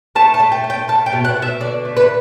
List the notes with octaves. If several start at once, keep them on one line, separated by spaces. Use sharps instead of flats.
A3 A5
A5
A3
G5
A3
G5
A3 A5
G5
B2
F#5
B2
E5
D3 D5
A3
B4